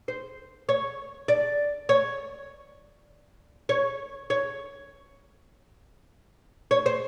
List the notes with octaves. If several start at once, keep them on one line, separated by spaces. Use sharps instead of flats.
C5
C#5
D5
C#5
C#5
C#5
C#5
C5